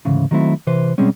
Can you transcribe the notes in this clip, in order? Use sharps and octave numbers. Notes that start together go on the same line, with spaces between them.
D2 G#2 C#3 E3
D#3 F#3 A3 C4 E4
C3 E3 B4 C5
B2 G3 G#3 C4 C#4